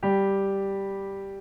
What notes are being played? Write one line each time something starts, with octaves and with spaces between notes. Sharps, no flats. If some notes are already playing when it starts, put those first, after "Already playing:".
G3 G4